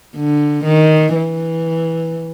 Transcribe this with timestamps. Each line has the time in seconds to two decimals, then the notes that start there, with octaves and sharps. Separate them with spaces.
0.15 D3
0.65 D#3
1.15 E3